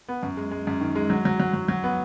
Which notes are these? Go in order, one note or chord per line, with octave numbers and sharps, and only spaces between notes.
B3
F#2
G#3
G#3
F#2
D#3
G#3
F#3
F#3
F#3
F#3
F#3
B3